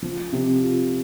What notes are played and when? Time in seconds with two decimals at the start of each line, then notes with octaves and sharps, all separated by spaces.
0.02 F3
0.33 C3
0.63 F4